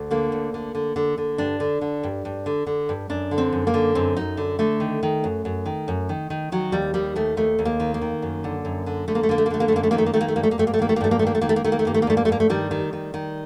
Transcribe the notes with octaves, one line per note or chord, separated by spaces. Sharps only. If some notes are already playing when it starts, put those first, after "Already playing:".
Already playing: D2
D3 A#3
D2
D3
D3
D3
D3
G2 D4
D3
D3
G2
G2
D3
D3
G2
F#2 D4
D3
C4
F#2
A#3
D3
F#2 C4
F#2 D#4
D3
D3 A3
D#3
D#3
F#2
F#2
D#3
F#2
D#3
D#3
D#3 F#3
D#2 G3
D#3 G3
D#2 A3
D#2 A3
D#2
A#3
D#3
A#3
D#3
F#2
D3
F#2
D3
D3 A3
A#3
A3
D3 A#3
A3
A#3
D3 A3
A#3
A3
F#2 A#3
A3
D#3 A#3
A3
A#3
D#3 A3
A#3
A3
G2 A#3
A3
A#3
G2 A3
A#3
A3
D#3 A#3
A3
A#3
G2 A3
A#3
A3
D#3 A#3
A3
D#3 A#3
A3
A#3
D#3 A3
A#3
A3
G2 A#3
A3
A#3
G2 A3
A#3
A3
G2 A#3
A3
D#3 G3
D#3
D#3
D#3